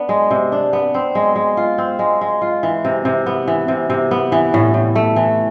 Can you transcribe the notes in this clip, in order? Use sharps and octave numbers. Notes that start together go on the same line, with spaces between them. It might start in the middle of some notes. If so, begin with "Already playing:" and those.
Already playing: B3 D4
G#3
C3
D4
B3
C4
G#3
G#3
F4
C4
G#3
G#3
F4
E3
C3
C3
B3
E3
C3
C3
B3
E3
A2
A2
A3
E3